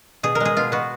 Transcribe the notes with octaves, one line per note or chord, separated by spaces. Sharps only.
B2 G#4
A#4
G#3 G#4
B2 F4
B3 F#4